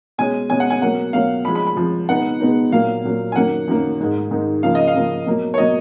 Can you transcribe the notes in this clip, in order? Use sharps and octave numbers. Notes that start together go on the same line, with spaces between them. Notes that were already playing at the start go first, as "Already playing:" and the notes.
B2 G#3 C#4 G#5
B2 G#3 C#4 G#5
F#5
G#5
B2 F#3 A#3 C#4 F#5
B2 F#3 A#3 C#4 F5
F2 F3 G#3 B5
B5
B5
F2 F3 G#3
B2 G#3 B3 D#4 F#5
B2 G#3 B3 D#4
A#2 F#3 A#3 F5
A#2 F#3 A#3
G#5
F#2 D#3 F#3 A#3 F#5
F#2 D#3 F#3 A#3
G#2 D#3 G#3 D#4
G#2 D#3 G#3 D#4
C#3 F3 A#3 F5
D#5
F5
C#3 F3 A#3
B2 F#3 A#3
C#5
B2 F#3 A#3 D#5